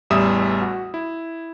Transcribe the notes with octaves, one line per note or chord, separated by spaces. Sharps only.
A1 E2 G3 E5 D#6 E7
F#4
E4